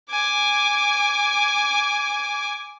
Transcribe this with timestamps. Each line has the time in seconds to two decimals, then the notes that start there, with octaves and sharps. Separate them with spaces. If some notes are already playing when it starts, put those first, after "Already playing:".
0.11 G#5 D6